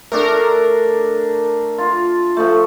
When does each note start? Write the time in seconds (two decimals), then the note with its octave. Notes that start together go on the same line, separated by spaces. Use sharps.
0.12 A3 D4 A4 A#4
1.78 F4
2.37 F3 A3